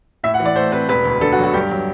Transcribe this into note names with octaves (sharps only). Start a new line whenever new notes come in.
A2 E5
F#5
E3
D5
A3 C5
C4 B4
E1 B4
D2
D3 A4
F#4
F#3
F#4
G2 G4
F#3